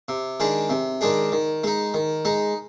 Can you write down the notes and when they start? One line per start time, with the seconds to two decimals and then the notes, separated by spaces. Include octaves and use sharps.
0.08 C3
0.40 D#3 G#3 D4 G#4
0.70 C3
1.01 D#3 G#3 D4 G#4
1.32 D#3
1.64 G#3 D#4
1.94 D#3
2.25 G#3 D#4